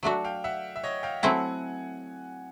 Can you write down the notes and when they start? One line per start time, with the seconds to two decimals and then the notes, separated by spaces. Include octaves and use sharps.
0.03 F#3 A3 D4 F#4 E5 F#5
0.24 F5 G5
0.44 E5 F#5
0.76 E5
0.83 C#5 D#5
1.03 F5 G5
1.23 F#3 A3 C4 E4 F#5 G#5